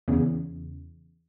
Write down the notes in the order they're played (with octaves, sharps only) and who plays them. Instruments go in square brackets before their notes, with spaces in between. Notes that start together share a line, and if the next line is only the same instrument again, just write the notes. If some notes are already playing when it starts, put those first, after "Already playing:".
[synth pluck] E2 C#3